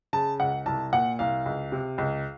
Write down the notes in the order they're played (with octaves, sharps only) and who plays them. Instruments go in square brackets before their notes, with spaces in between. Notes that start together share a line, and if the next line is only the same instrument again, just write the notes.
[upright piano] C#3 A5
C#2 F#5
C2 A5
A#2 F#5
C2 F5
C#2
C3
C#2